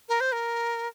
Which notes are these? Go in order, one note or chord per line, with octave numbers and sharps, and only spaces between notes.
A#4
C5
A#4